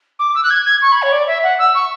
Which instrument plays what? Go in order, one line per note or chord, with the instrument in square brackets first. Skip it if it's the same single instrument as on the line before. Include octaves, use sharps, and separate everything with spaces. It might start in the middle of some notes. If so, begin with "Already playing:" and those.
[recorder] D6
E6
F#6
G#6
G#6
C#6
B5
C#5
D5
E5
F#5
E6
C#6